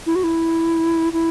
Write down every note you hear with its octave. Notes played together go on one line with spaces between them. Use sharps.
E4
F#4
E4
E4